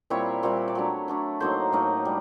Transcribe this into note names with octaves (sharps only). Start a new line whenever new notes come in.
A#2 G3 C4 E4 C#5
A#2 G3 C4 E4 C#5
D5
F#3 A3 D4 C#5
F#3 A3 D4
A2 F#3 A#3 D#4 C5
A2 F#3 A#3 D#4
G3